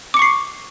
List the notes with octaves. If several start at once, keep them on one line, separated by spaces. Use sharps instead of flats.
C#6 D6 C7 C#7